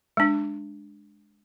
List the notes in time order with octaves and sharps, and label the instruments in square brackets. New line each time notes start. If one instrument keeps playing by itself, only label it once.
[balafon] G#3 D4